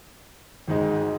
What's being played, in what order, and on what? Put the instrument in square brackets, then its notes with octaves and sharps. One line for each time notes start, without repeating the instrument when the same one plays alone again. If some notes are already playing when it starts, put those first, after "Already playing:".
[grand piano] G#1 G#2 G#3 D#4